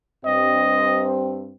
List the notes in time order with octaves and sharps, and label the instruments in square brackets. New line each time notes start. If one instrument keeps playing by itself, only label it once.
[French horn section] G2 C4 [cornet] D#5